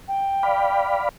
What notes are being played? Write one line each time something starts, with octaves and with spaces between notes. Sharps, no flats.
G5
D5 F5 B5